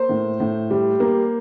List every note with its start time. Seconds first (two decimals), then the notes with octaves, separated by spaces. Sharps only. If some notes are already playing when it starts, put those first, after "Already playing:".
Already playing: A#3 C5
0.09 A2
0.40 A2
0.70 G3
1.00 A#3